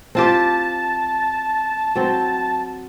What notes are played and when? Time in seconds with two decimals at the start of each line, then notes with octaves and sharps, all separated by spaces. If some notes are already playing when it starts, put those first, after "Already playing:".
0.15 C4 F4 G4 A5
1.95 F#3 C4